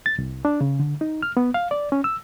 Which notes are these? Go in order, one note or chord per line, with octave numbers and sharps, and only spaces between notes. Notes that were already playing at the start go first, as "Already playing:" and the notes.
A6
C2
D4
C#3
D3
D#4
F6
B3
F5
D5
C#4
E6